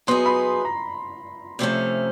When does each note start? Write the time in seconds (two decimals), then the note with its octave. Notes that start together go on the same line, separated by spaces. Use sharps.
0.07 F#3 B3 D#4 G#4 C6
0.26 B5
0.65 A#5
1.59 C3 F3 A3 C#4